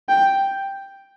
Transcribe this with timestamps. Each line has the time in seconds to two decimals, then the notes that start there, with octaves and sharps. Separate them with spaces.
0.09 G5